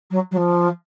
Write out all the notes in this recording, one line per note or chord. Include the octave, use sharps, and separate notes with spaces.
F#3
F#3
F3